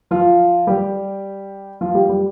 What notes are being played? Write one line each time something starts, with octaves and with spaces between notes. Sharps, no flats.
F3 F4
G3 G4
F3 F4
G3 G4
G3 G4